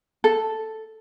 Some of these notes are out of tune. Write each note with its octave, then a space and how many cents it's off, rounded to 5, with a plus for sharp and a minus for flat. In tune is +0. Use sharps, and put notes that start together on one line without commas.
A4 +0